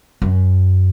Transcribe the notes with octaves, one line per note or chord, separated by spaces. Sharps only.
F#2